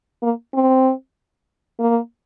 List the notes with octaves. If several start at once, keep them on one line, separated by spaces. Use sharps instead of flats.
A#3
C4
A#3